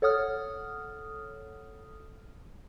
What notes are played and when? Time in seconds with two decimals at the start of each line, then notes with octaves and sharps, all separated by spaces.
0.02 A4 C#5 F#5 D#6 F6